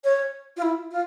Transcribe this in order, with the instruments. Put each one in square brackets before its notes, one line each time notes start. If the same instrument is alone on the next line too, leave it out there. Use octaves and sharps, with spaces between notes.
[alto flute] C#5
F4
E4
F4